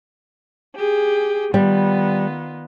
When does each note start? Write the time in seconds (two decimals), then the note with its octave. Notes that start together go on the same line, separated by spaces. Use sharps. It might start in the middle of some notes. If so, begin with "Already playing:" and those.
0.76 G4 G#4
1.54 D#3 G3 B3 F4